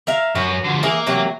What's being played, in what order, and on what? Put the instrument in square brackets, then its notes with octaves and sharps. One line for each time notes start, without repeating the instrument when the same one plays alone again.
[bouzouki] A#4 E5 F5
[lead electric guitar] F#2 [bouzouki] F#4 B4
[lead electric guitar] D3 F3
[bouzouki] E3 G#4 [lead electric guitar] A#3
[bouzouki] C3 E3 F#3